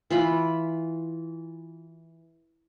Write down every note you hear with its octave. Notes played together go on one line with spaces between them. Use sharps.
E3 F4 B5